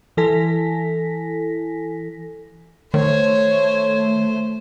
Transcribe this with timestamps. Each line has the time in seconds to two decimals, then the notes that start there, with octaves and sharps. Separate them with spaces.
0.17 E3 E4 A4 G#5 A#6 B6
2.94 D#3 A3 C5 C#5